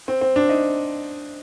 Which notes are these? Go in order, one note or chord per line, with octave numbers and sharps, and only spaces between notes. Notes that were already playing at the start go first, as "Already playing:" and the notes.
C4
C4
D4
D#4